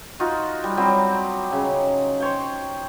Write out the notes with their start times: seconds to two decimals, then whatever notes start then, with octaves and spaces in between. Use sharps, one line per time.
0.20 D#4 F4 F#4
0.64 G3
0.77 F#3 G3 C4
1.53 C#3
2.20 C5 C#5 G5